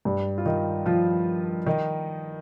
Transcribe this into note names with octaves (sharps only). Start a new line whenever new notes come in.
G2 G3
F4
D#3 D#4
F3 F4
D#3 D#4